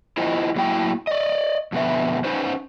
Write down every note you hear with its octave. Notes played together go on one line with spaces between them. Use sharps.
E4 F4 A#4 C5 D#5
A2 F#3 A#3 E4 F#5 G5
D5 D#5
F2 B2 D3 B4 E5
C#4 D#4 B4 C5